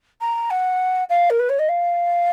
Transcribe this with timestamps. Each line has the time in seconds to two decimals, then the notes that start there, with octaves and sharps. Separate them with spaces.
0.21 A#5
0.50 F#5
1.10 F5
1.30 A#4
1.39 B4
1.49 C#5
1.59 D#5
1.69 F5